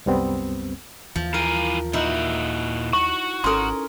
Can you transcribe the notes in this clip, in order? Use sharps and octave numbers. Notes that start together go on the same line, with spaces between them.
C2 F#2 G3 B3 C4
D#2 E3 F3
E4 A#4 F5 G#5
A#2 D#4 E4 F#4
F#4 C#6
G#1 C#4 A4 A#4 C6